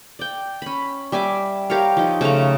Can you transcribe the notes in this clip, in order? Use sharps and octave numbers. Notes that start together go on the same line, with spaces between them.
D5 G5
C#4 B5
G3 E5 G#5 D6
G4 A#4 C#5 F5
F3 D#4
C#3 A3 C#4 A#5